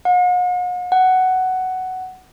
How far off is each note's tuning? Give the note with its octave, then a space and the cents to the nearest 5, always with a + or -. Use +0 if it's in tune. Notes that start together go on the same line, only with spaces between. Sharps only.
F#5 -45
F#5 +10